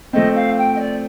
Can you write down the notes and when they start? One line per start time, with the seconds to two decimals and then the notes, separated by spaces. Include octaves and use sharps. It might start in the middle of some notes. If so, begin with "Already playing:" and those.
0.13 F3 A3 C4 D#5
0.35 F5
0.58 G5
0.75 D#5
0.80 D5